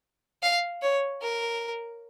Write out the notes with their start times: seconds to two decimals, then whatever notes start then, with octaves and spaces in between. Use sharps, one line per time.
0.42 F5
0.82 C#5
1.22 A#4